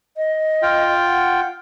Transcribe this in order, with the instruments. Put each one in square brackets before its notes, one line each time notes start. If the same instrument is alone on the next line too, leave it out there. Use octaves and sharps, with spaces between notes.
[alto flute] D#5
[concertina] F4 G5
[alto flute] F#5